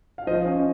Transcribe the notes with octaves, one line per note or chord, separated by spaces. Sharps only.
F5
F3 C5 D#5
C#4